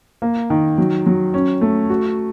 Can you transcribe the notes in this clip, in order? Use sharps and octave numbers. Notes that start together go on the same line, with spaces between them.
A#3
D#3
F#3
F#3
C#4
A3
F#4